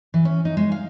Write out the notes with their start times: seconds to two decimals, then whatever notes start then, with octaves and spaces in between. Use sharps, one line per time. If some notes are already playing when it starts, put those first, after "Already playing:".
0.14 E3
0.25 C#4
0.45 D#4
0.57 G#3
0.72 F5